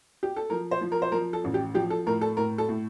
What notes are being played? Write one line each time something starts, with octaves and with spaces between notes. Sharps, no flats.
G4
A4
F3 A#4
C5
F3
A#4
C5
F3 A#4
A4
A1
G4
F3 G4
A4
A2 A#4
A4
A2 A#4
A4
A2